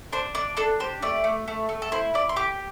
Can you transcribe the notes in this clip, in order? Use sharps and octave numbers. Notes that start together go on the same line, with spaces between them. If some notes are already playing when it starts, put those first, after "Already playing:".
D4 C5
D4 D5
D4 A4
G4 C5
A3 D5
A3
A3
A3
A4
E4 C5
E4 D5
C6
G4 D6